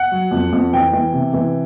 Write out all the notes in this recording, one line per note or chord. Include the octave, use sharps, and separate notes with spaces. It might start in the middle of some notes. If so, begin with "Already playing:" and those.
Already playing: F#5
F#3
F2
F2
E3 G5
E3
C3
E3